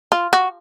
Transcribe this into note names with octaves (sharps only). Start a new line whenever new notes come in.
F4
F#4